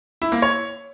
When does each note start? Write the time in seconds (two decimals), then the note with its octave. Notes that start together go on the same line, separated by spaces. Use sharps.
0.22 E4
0.32 A#3
0.42 C#5